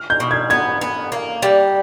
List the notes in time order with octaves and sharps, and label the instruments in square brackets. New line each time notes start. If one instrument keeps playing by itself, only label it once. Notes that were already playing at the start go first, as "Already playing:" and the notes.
Already playing: [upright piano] F6
G6
[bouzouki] B2
[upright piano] G#6
[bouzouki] B3 [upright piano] G#6
[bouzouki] B3
A#3
G3